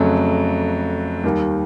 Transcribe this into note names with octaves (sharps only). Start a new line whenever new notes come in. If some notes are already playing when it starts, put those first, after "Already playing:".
Already playing: F2 C#3 F#3 A3
D#2 D#3 G3